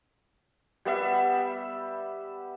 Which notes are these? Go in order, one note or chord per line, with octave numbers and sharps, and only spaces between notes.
G3 B3 E5